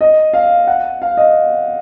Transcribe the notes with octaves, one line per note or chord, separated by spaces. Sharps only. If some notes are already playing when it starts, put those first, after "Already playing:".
D#5
F5
F#5
F5
D#5